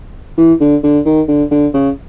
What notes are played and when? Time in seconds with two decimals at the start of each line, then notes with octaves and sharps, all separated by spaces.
0.38 E3
0.60 D3
0.84 D3
1.06 D#3
1.28 D3
1.51 D3
1.74 C#3